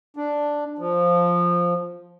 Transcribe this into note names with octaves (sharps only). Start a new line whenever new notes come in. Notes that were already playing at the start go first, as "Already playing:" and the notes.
D4
F3